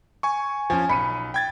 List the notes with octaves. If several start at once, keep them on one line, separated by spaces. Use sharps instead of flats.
G#5 C#6
F3 C#4 G#5
B1 B5 C#7 D#7
G5 G#6 A6